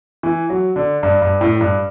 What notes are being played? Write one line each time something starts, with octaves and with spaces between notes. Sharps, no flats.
E3
F#3
D3
G2
G2
A2
G2